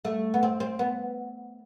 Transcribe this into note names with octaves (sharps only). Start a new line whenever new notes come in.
A3
B3
C4
C4
B3